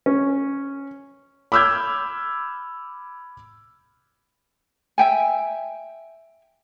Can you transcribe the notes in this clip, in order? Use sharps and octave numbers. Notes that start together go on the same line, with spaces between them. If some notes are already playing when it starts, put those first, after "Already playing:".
C#4
B5 D6 E6 F6 G6 G#6
E5 G5 G#5